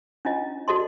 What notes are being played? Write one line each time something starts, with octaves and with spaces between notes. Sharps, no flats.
C#4 D4 E4 F4 D#5
F#4 A4 D5 D#5 A5 C6